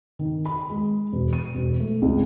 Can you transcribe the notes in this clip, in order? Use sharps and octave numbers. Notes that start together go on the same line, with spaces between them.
D#3
B5
G#3
E1
D#7
E1
A3
C#2